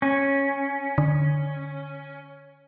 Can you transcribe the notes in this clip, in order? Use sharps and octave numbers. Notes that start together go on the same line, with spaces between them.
C#4
D3